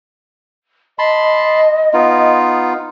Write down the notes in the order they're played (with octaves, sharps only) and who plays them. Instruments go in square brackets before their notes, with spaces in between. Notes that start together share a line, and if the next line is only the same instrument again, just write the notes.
[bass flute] D#5 [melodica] A5 B5 C6
[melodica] B3 D#4 F4